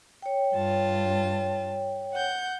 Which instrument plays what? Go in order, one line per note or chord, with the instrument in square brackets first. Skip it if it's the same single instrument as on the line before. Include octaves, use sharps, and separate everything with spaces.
[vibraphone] C#5 G5
[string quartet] G2 F4 A5
F#5 G6